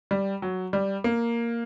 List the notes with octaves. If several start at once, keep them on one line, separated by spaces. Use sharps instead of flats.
G3
F#3
G3
A#3